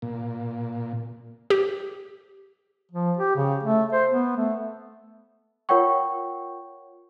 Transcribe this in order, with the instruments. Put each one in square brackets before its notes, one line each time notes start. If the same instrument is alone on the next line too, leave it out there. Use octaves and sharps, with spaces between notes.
[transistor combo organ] A#2
[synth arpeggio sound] G4
[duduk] F3
G4
C#3
A3
C5
B3
A3
[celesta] F4 A#4 C#5 F#5 G5 C#6